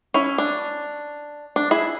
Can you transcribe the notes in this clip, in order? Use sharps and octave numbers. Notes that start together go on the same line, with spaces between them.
C#4 E4
D4
D4
E4 G#4